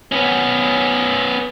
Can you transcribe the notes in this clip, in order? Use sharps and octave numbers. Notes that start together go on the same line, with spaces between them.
B3 C#4